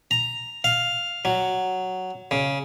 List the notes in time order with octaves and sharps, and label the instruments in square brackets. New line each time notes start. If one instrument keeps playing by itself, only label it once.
[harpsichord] A#5
F5
F#3
C#3